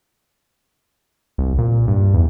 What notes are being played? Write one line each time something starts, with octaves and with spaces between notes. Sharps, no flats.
C2
A#2
G2
E2